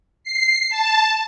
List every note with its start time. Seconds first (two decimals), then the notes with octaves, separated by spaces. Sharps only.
0.24 C7
0.70 A5